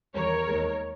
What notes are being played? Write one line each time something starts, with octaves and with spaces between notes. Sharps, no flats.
E2 D#3 G3 A#4 C#5
D#2 D#3 G#3